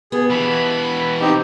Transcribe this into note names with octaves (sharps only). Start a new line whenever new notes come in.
D#2 B3 G#4
B2 E3 B5
C4 D#4 G4